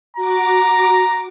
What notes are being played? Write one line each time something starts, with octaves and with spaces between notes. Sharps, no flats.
F#4 A#5 D6